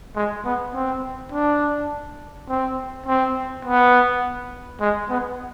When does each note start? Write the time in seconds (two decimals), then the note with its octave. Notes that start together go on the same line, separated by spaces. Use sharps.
0.15 G#3
0.45 B3
0.74 C4
1.32 D4
2.49 C4
3.06 C4
3.65 B3
4.80 G#3
5.09 B3